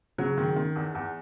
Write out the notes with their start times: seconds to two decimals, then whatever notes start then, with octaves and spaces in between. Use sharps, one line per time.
0.18 C#3 F#3
0.38 D#3
0.56 D#3
0.76 E2
0.95 E2